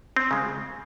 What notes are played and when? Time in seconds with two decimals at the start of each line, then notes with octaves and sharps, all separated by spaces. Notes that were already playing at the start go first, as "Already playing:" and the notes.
0.16 C4
0.31 C#3 G#3